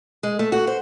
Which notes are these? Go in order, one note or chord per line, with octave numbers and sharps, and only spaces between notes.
G#3
A3
F#4
C5